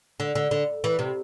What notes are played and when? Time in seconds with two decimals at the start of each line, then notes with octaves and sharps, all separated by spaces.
0.20 D3
0.35 D3
0.51 D3
0.84 E3
0.99 C3